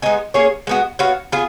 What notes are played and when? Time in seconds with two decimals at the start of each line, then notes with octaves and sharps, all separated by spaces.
0.02 G#3 B3 D#4 G#4
0.34 A#3 C#4 G#4 C#5
0.67 G#3 B3 F#4
0.99 B3 F#4 C#5 F5
1.32 B3 F4 G#4